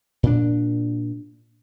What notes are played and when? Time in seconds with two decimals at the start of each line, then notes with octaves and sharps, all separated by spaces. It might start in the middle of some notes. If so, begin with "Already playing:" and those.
0.23 A#2 D4